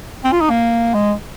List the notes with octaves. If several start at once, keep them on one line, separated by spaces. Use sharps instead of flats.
C4
F4
D#4
A#3
G#3